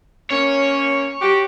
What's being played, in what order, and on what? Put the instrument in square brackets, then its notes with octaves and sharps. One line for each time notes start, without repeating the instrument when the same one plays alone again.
[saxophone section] A#3 C#4 [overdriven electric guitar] C#5
[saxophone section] F#4 G4